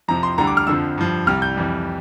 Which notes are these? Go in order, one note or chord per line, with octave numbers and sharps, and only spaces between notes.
F2 C3 F3 A#5
C6
D2 D3 G3 A#5
D6
F6
F2 D3 F3 E6
G2 F3
C2 C3 G3 F6
G6
F2 E3 G3